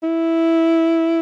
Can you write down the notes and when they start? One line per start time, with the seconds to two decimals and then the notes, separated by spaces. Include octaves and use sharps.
0.03 E4